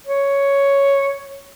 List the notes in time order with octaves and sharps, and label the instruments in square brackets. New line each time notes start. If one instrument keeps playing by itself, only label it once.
[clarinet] C#5